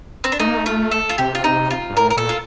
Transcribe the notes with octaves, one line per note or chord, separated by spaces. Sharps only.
C4
D4
A3 D#4
A#3
A3
F4
A4
F4
C3 G4
F4
D#4
F4
G2
A2 A#4
A#4
A#2 A4
F4